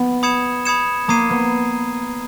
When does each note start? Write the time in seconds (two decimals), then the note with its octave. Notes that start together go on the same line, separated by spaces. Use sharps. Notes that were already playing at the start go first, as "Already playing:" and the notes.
Already playing: B3
0.23 B5 D#6 G#6 C#7 E7
0.65 B5 D#6 G#6 C#7 E7
1.08 A#3 A#5 D#6 G#6 C7 D#7
1.30 B3